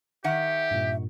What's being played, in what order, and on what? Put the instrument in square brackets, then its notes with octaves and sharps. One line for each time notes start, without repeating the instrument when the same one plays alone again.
[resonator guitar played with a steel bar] D#3 F#5 [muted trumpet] G4 [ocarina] E5
[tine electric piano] G2 A#2